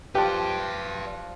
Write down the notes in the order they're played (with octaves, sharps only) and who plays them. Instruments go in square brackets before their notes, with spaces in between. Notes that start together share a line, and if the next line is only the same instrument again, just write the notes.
[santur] F3 F#5 [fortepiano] G4 [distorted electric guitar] B4 D5